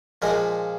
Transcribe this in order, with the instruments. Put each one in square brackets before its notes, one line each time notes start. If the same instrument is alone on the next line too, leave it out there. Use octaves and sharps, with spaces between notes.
[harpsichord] A#2 F3 G#3 A#4